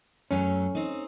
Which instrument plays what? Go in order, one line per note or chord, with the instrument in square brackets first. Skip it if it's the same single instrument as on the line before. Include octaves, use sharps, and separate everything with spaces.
[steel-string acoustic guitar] F#2 F#3 A3 [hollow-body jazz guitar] C#4
[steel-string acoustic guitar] C4 D#4